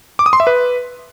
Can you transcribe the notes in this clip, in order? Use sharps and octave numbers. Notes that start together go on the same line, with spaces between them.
D6
D#6
C6
E5
B4